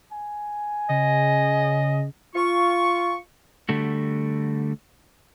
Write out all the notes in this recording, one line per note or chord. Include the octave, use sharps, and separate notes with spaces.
G#5
C#3 D#5
F4 C#6
D3 G3 A3 F#4